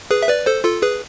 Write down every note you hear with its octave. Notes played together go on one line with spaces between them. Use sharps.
G#4 B4
E5
B4 D5
A4 C5
F4 A4
G#4 B4